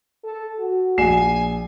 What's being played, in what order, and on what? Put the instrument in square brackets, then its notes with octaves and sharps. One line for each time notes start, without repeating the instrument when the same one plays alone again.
[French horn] A4
F#4
[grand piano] A#1 C7 E7 [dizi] G#5